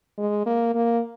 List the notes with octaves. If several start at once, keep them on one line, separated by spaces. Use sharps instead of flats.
G#3
A#3
A#3